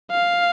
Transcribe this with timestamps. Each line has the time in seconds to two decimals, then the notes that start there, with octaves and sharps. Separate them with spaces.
0.11 F5